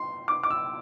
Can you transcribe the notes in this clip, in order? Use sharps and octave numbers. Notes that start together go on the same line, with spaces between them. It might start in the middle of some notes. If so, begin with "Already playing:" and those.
Already playing: C6
D6
D6
E6